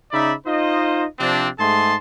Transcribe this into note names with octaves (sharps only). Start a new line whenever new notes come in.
C#3 D#4 D5 E5 B5
D#4 F4 C5 D#5
C3 F3 C4 D4
G#2 A3 G#4 A5 C6